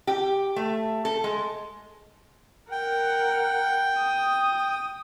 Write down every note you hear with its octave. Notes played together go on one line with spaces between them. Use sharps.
G4
A3
A4
G#3
A#4 F#5 G5
D#6